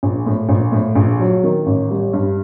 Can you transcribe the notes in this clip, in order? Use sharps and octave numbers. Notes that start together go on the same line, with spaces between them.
A#1
A2
A#1
A2
A#1
F#3
D#3
A1
G3
G2